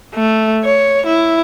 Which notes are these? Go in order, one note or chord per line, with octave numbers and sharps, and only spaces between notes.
A3
C#5
E4